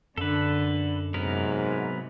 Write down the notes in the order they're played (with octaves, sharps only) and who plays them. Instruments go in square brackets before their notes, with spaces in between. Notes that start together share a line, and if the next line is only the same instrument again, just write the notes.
[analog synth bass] F#2 [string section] D3 [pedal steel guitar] A4 B4
[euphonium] G#2 [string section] C3 [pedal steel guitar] F#3 B3 A#4